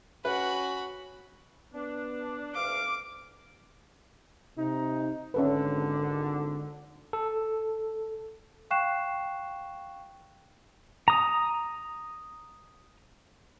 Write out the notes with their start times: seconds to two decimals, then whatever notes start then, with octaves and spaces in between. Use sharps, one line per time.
0.25 C#4 F#4 B4 B5
1.74 B3 D4
2.55 D2 G2 F5 D6
4.56 C3 D#4
5.34 G#1 D3 C#4 A4 B4
7.13 A4
8.71 F5 G5 C#6 F#6 C7 E7
11.08 A#5 D#6